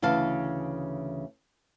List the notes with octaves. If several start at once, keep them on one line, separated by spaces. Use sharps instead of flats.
D2 C#3 E3 F5 A5